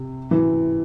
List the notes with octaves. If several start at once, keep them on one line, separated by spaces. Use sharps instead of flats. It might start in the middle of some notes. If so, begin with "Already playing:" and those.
Already playing: C3
E3